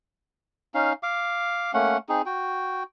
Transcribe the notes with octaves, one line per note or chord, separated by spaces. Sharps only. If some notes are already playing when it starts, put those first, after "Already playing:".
C#4 D#4 F5
F5 D6
A3 A#3 C#4 F#5
C4 D#4 G#4
F#4 G5